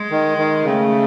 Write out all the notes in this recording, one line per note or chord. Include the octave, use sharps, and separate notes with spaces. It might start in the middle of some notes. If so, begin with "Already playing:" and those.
Already playing: G#3
D#3
D#3
C#3 A3